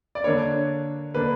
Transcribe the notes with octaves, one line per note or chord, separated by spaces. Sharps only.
D5
D3 A#3 D4 C#5
D3 A#3 D4 B4